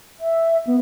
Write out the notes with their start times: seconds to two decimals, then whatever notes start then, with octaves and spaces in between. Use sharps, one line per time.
0.20 E5
0.67 B3